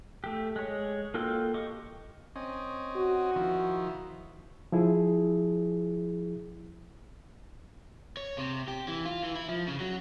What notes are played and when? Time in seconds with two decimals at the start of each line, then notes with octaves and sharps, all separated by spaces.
0.24 A3 G4
0.56 G#3 C#5
1.14 A#3 F4 F#4 A4 G5
1.54 G4 D#5 C#6 D6
2.36 C4 C#4 D#5
2.96 F#4
3.36 D#3 F3 E4
4.72 F3 E4 G#4
8.17 C#5
8.38 C3
8.68 G4
8.88 E3
9.06 F4
9.23 E3
9.35 E4
9.49 F3
9.68 C#3
9.80 F#3